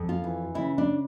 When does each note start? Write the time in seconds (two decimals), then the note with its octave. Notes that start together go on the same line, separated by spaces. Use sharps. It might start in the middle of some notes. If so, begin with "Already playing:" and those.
Already playing: F2
0.09 F4
0.24 E3
0.55 C#3 E4
0.78 D4